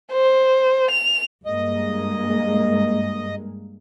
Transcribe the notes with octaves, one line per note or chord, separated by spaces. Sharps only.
C5
F7
G2 G#3 A#3 D#5